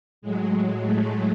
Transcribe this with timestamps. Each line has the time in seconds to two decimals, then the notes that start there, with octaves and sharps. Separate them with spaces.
0.22 A2 F#3 G#3
0.82 A3